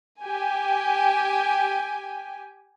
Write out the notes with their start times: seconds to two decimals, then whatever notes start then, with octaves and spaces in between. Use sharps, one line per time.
0.25 G4 G5 G#5